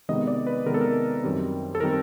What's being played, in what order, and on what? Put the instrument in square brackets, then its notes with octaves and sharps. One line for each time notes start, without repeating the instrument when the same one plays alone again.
[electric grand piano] C3 D#3 G#3 B3 D#5
D5
B4
C3 D#3 G#3 B3 A#4
A4
A#4
F#2 D#3 G3 C4
A4
D#3 G3 C4 A#4